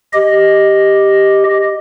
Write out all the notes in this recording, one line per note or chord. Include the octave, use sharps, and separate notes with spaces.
G4 D#5